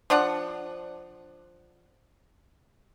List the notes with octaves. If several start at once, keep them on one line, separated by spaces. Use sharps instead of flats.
F3 D4 F#5